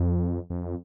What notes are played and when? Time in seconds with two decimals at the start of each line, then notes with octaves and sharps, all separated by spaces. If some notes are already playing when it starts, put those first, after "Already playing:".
Already playing: F2
0.50 F2